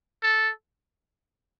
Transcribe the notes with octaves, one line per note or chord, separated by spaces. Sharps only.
A4